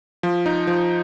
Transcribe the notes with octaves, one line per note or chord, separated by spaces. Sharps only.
F3
D#4
F3